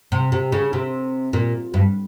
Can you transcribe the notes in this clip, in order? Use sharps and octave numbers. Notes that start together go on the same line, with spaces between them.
C3
C3
C#3
C3
A#2
G2